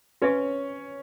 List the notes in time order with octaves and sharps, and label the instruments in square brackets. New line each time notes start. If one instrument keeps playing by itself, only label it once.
[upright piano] C#4 C#5 [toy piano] F#4 B4 E5 G#5 C#6